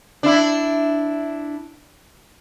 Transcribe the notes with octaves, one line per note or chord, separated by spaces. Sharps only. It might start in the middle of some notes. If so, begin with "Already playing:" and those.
D4 E4